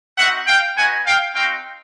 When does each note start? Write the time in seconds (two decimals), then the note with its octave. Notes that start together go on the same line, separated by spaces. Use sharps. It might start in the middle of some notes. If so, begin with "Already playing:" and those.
0.18 C4 D#4 F#4 E5 F#5
0.47 F5 G5
0.76 B3 D#4 F#4 F#5 G#5
1.06 F5 G5
1.35 C4 D#4 F#4 F5 G5